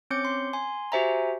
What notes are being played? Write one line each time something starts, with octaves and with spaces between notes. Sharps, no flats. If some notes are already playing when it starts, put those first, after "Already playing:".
C4 C#4 C#5 D6 G6 C#7
C6
G#5 C6
F#4 G4 C5 E5 G#5 A#5